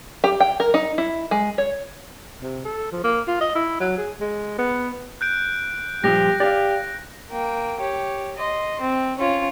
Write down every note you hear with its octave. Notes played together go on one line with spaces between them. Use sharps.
G4
G5
A#4
D#4
E4
G#3
C#5
C3
A4
F3
A#3
F4
D#5
E4
F#3
G#4
G#3
B3
F#6 G6 D7
G2 A#2 F3 G4 A#6
G4 D5 F5
A#3 G5
G4 C#5
D#5 C6
C4
C#4 F4